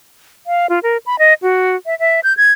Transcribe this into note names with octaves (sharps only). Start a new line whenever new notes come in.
F5
F4
A#4
B5
D#5
F#4
E5
E5
G6
G#6